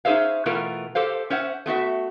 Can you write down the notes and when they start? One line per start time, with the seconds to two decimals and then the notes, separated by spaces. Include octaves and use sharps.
0.05 C#4 D#4 G#4 C5 E5 F5
0.46 B2 E3 A3 B3 F4 A#4
0.95 G4 A4 C5 F5
1.30 C#4 C5 E5 F#5
1.66 A3 B3 F#4 E5